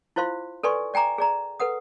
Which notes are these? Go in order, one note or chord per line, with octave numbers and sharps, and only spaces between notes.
E4 F4 C5 F5 C6
A4 B4 D5 G#5 C6 C#6
D5 G5 G#5 A#5 D6
G#4 D5 A#5
A4 B4 F#5 D#6